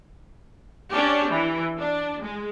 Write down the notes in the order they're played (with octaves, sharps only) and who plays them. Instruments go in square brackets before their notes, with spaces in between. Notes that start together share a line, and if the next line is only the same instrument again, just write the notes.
[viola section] C#4 D4 G4
E3
D4
G#3